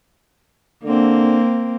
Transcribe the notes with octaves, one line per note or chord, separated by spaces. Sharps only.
D3 A#3 C4